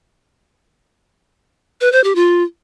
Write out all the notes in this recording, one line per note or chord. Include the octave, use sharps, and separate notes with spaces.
B4
C5
G4
F4